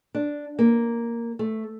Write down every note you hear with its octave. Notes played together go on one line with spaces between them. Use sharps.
D4
A#3
A3